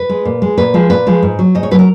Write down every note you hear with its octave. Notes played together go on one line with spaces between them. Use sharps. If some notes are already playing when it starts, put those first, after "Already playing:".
Already playing: B4
G#3
A#2
G#3
A#2 B4
F3 G#3
A#2 B4
F3 G#3
G#2
F#3
G#2 D#5
C#5
F#3 B4
A#4